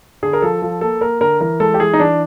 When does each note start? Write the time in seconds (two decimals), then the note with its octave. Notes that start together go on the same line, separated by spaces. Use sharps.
0.23 D3 G#4
0.33 A#4
0.42 F3 A4
0.62 F3 A4
0.81 A#3 A4
1.01 A#3 A#4
1.21 D3 A#4
1.41 E3 A#4
1.60 G#3 A4
1.74 G4
1.80 E3 G#4
1.93 D#4
2.00 E3 D4